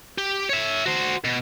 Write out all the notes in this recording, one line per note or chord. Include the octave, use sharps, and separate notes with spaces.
G4
C#5 E5
F#4 C5
B2